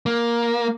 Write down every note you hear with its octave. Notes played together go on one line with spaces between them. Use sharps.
A#3